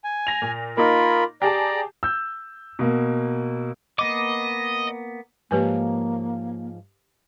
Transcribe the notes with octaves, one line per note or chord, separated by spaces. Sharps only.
G#5
A#6 F7
A#2
A#3 D#4 F4 A#4 B5
G4 G#4 D5 A5 A#5
E6 G6
B2 A#3
A#3 B3 D#5 D6
G#2 F3 A#3 G4 B4 C#5 G#5